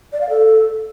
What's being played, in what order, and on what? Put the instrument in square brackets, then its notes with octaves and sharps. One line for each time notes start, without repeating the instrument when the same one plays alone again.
[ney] D5
F5
A4